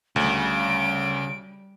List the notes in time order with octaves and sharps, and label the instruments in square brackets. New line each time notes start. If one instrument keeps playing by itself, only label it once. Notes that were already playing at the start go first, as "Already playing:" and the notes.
[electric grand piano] D2 [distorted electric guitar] C#3 [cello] G3 [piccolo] D7